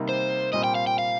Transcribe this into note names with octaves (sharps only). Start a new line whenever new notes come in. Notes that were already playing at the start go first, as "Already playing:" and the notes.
Already playing: C3 D#3 G3 A#3 D#4
C5
A#2 G3 C4 D#5
G5
F5
G5
F5